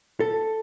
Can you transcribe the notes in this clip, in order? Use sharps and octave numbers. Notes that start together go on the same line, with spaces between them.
A4